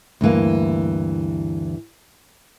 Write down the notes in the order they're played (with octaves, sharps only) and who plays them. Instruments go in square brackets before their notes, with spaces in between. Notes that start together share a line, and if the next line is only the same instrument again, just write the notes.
[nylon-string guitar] D2 G2 E3 A#3